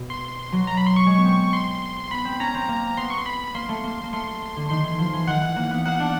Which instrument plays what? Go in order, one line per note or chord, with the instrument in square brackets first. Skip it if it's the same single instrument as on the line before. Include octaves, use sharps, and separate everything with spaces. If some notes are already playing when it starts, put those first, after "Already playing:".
Already playing: [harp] B2
[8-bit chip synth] C6
[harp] F#3
[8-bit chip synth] A#5
B5
C6
C#6
[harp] G#3
B3
C4
[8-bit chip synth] C6
[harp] B3 [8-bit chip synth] B5
[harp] C4
[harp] C#4 [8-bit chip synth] A#5
[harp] C4
A#3
[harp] B3 [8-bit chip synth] C6
[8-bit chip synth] C#6
C6
B5
[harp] A#3 [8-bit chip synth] C6
[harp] A3
A#3
A#3
[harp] A3 [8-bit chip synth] C6
[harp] D3
[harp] D#3 [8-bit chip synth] C6
[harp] E3
F3
E3
[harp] D#3 [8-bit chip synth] F#5
[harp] E3
A#3
B3
[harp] A#3 [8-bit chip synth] F#5
[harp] D4